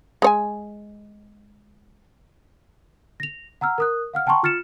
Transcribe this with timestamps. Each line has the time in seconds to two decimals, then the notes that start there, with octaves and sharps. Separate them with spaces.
0.22 G#3 C#5 G#5
3.20 A#6 F7
3.61 F#5 A#5 E6 F6
3.78 A#4 D#6 F#6
4.14 F5 F#5 F6
4.26 F#5 G5 A5 A#5 C6 C#6
4.43 F4 F6 A6 C#7 E7